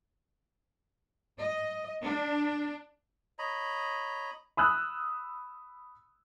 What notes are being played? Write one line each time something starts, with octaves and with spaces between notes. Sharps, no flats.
D#5
D4
C#5 D#5 A#5 B5
B5 D#6 E6 F#6